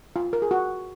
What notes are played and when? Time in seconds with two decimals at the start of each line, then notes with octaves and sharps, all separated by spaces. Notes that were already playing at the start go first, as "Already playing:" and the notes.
0.16 F4
0.33 A#4
0.42 G#4
0.51 F#4